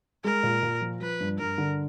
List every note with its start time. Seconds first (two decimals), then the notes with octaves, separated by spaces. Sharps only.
0.24 G#3 A#4
0.43 A#2
0.63 A#2
0.81 F3
1.01 F3 B4
1.20 G2
1.39 G2 A#4
1.58 D3